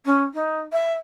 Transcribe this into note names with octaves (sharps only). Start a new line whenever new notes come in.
C#4
D#4
E5